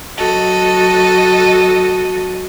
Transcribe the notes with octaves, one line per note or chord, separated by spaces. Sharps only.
F#3 F#4 A4 D#5